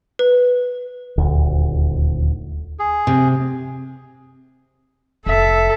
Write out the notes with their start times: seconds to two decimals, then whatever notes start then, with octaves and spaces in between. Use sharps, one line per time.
0.19 B4
1.18 D#1 D2
2.79 G#4
3.07 C3
5.26 F1 A4 E5